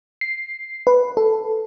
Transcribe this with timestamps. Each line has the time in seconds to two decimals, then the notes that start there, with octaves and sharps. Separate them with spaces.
0.21 C7
0.87 B4
1.17 A4